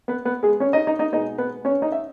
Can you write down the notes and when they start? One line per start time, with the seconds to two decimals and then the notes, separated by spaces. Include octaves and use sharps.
0.08 B3 B4
0.25 B3 B4
0.43 G#3 G#4
0.60 C#4 C#5
0.73 D#4 D#5
0.87 D#4 D#5
0.99 D#4 D#5
1.12 B2 G#3 B3 D#4 D#5
1.38 B3 B4
1.65 C#4 C#5
1.82 D#4 D#5
1.92 E5